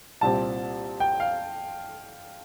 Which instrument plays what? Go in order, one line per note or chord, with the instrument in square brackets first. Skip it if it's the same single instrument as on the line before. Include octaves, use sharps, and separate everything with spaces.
[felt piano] C2 A#2 G3 C4 G4 [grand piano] A5
[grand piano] G5
F5